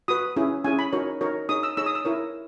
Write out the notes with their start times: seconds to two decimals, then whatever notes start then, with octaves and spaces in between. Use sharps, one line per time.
0.08 F#4 B4 D#6
0.36 C#4 E4 G#4
0.64 C#4 E4 G#4 G#5
0.79 B5
0.93 D#4 F#4 A#4 C#5
1.21 D#4 F#4 A#4 C#5
1.49 D#4 G#4 C#5 D#6
1.63 E6
1.77 D#4 G#4 C#5 E6
1.86 D#6
1.95 E6
2.05 E4 A#4 C#5